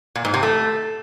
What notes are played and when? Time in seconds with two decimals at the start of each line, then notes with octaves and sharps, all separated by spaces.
0.15 A#2
0.25 G#2
0.34 C3
0.43 A3